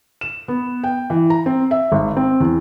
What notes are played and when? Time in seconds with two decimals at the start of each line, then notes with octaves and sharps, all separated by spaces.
0.21 E7
0.48 B3
0.84 G5
1.10 E3
1.30 A#5
1.46 C4
1.71 E5
1.92 G#1
2.17 C4
2.40 E2